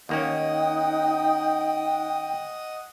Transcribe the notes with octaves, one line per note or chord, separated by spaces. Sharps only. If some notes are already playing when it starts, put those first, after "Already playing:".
D#2 A#3 C#4 D#4 D#5 F#5 G5 D#6